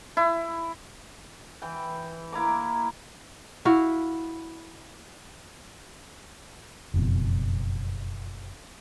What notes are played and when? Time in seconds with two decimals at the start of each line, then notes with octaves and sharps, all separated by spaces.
0.17 E4
1.62 E3 G5
2.32 A#3 E4 A#5 D6
3.65 E4 F#4 F5
6.94 F#1 F2 B2